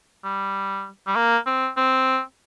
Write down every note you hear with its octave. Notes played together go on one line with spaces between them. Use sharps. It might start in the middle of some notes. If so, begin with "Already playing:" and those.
G3
G3
A#3
C4
C4